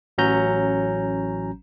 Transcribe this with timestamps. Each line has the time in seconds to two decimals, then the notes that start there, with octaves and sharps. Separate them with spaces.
0.18 A1 F#3 C#4 A#5 G6